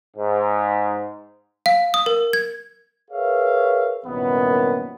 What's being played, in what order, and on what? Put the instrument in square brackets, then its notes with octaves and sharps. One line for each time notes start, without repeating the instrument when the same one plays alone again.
[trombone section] G#2
[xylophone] F5
D#6
A#4
G#6
[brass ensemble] G#4 A#4 B4 C#5 E5 F5
C2 F#2 A#2 D#3 B3